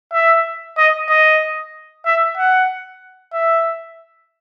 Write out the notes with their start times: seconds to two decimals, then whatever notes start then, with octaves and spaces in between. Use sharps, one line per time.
0.13 E5
0.78 D#5
1.10 D#5
2.06 E5
2.38 F#5
3.33 E5